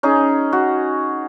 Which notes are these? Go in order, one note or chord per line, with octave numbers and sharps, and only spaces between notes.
C#4 D#4 G#4
F#4